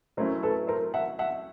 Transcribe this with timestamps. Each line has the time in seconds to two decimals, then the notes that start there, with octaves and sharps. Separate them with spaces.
0.17 F#3 A3 C#4 E4 A#4 C5
0.43 A4 B4
0.67 A#4 C5
0.94 E5 F#5
1.19 E5 F#5